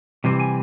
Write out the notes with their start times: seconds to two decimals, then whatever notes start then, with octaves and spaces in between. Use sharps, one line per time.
0.24 C3 E3 G3 C4
0.40 G#5